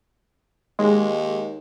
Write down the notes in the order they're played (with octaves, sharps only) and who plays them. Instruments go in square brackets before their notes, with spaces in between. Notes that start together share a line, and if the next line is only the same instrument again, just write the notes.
[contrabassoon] D#2 [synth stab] G#3